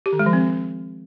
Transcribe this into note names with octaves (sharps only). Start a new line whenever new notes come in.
G4
D#3
G#3
F3
C4